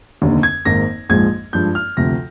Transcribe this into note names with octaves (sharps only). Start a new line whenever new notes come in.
F1 D#2 D3
G#6
G#1 G#2 D#3 A#3 A#6
A#1 G#2 F3 G#3 G#6
G2 F3 G#3 G6
F6
D2 C3 F3 A#6